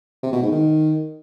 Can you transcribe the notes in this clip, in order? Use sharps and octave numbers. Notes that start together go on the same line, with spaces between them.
C3
B2
G#2
D#3